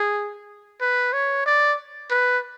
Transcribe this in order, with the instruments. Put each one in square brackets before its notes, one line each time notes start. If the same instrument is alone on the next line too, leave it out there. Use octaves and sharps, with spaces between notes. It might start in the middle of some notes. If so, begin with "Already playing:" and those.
Already playing: [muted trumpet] G#4
B4
C#5
D5
B4